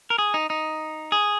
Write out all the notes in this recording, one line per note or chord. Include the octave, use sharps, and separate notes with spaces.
A#4
G#4
D#4
D#4
G#4